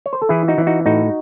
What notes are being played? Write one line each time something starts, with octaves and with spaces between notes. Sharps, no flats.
C#5
C5
A4
E3 E4 G#4
D#4 F#4
E3
D#4 F#4
A2 D#4 F#4